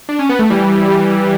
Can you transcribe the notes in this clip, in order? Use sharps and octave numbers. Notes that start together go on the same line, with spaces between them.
D4
C#4
B3
A3
E3 G3